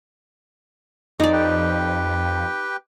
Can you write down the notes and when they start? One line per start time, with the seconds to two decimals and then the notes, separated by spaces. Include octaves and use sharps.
1.20 F2 D#4 G#4 D5 D6
1.33 G4 B4 G5